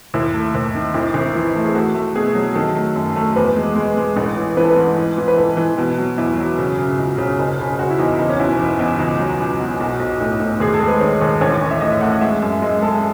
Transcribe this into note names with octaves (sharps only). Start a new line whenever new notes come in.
D#2 E4
A3
D#2
D#3
G#1 E4
G#1
E3
A3
G#4
A3 F#4
A3
B2 G#4
F#3
D#3 A4
A3
F#2
A3
E2 B4
G#3
G#3
G#3
A1
E3
E3 B4
A4
B4
G#2
E3
E3
B4
E3 A4
E3
B2
F#3
E2 E4
F#3
C#3
C#3
C#2
C#3
F#1
C#3
F#1 F#4
E4
E2 D#4
F#1 D#4
C#4
B2 E4
C#4
E2
E2
C#2 D#4
F#3
C#2
B2
B1 F#4
B1
A2
A2
D#2 G#4
A4
G#3
B4
D#3 C#5
D#2
A1 C#5
A1
E5
A2 D#5
E5
A3 F#5
F#5
G#3 E5
F#2
G#3 D#5
G#3 A4